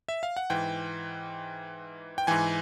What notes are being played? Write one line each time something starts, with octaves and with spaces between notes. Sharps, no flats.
E5
F5
F#5
G#2 E3 G5
G5
G#2 E3 G#5